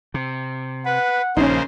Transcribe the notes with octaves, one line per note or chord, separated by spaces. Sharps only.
C3
B4 F#5
A#1 C#3 A#3 C#4 D#4 C5